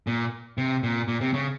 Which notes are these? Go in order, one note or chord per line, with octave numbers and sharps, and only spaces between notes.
A#2
C3
A#2
A#2
C3
C#3